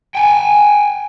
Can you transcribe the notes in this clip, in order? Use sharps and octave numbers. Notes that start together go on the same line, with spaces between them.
G5 G#5